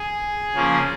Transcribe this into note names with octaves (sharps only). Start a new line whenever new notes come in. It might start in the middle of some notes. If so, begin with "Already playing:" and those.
Already playing: G#4
C#3 F3 A#3 C#4